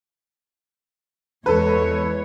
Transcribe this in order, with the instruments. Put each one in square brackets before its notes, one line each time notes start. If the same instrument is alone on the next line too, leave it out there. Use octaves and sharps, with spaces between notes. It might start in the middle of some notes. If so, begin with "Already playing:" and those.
[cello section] E2 G#3 C#5 [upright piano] A4 B4